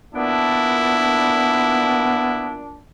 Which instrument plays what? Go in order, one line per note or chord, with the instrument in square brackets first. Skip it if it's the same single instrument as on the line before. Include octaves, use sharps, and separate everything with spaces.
[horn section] A#2 D4 [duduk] B3 [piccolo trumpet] E4